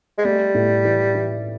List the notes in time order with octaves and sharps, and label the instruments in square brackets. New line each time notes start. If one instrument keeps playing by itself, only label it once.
[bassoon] G#3
[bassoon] G3 [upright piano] A3
[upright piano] A2
E3
E3